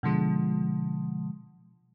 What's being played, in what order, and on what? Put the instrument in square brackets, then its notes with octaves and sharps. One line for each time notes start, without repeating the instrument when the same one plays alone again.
[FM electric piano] B2 D3 F3 G#3